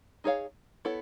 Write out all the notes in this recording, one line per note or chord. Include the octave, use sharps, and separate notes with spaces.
D#4 G#4 C#5 F5
B3 E4 A4 C#5